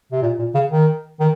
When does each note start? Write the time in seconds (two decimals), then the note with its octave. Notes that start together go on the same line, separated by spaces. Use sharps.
0.12 C3
0.22 A#2
0.39 A#2
0.54 C#3
0.71 D#3
1.20 D#3